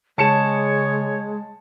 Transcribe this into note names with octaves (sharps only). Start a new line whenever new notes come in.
C#3 G#3 G#4 C#5 A5 C#7 E7